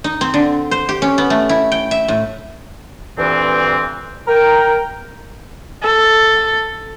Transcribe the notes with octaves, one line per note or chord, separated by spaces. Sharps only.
D#4
C4
D3
C5
G4
C#4
B3
A3
E4
G5
E5
A2
D2 G2 A#2 E3 C4
A#4 G5
A4